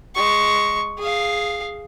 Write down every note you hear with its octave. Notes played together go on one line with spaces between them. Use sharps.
G#3 C#6
G#4 F5